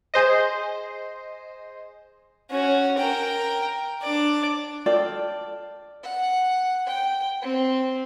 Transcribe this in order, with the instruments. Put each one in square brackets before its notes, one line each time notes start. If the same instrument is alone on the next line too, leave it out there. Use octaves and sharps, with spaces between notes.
[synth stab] G#4 C5 D#5
[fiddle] C#4 F#4
A#4 G5
D4 D5
[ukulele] F4 A4 D5 G5
[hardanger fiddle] F#5
G5
C4